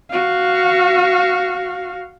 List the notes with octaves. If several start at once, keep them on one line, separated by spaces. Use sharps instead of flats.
F#4 F5